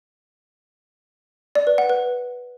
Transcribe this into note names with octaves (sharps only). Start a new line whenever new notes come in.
D5
B4
F#5
B4